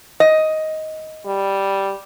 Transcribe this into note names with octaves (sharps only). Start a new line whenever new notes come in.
D#5
G3